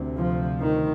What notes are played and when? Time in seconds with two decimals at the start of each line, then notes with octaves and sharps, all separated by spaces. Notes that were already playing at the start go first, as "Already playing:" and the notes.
Already playing: D2 C3
0.17 F3
0.61 D#3